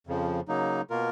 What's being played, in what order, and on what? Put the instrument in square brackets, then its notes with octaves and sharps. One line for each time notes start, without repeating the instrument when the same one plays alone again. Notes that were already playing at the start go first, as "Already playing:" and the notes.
[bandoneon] F2 C#3 F3
C#3 F#3 A#3 D#4
B2 A#3 F4 A#4